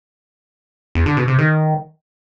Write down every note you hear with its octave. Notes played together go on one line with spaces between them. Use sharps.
E2
D3
B2
C3
D#3